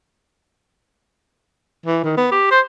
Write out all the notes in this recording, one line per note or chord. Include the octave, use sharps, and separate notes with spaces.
E3
D#3
B3
G4
C5